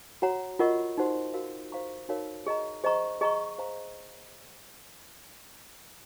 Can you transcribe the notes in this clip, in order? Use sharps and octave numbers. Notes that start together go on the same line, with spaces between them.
F#4 C#5 F#5 A#5
F4 A#4 D#5 F#5 C#6
D#4 F#4 C5 F#5 C6
F#4 A#4 F5
C5 F5 A#5 C#6
D#4 F#4 A#4 C#5 F5
G#4 D#5 A#5
G#4 C5 D#5 A#5 C#6
G#4 D#5 A#5 C#6
C5 F5 A#5